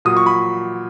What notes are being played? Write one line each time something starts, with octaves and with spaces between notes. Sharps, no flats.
A#2 F#3 D#6
C#6
B5